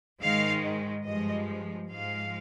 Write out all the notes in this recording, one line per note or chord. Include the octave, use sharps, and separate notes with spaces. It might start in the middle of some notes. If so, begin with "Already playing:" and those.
G#2 D#3 G#3 F5
G2 F3 G#3 D#5
G#2 F3 G#3 F5